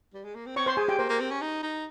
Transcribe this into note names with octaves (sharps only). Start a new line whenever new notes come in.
G3
G#3
A#3
C4
C4 C#5 C#6
C5 C6
G#3 G#4 G#5
G4 G5
A#3 C5
A#3
C4
C#4
D#4
D#4